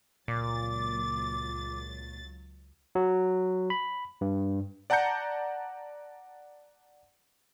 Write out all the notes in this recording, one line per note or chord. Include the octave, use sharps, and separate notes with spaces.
C#2 A#2 F#3 D6 A6
F#3
B5
G2
D5 F#5 A5 A#5 G6 C#7